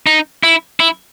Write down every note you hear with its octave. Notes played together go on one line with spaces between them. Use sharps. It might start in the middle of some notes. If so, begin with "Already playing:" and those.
D#4
E4
E4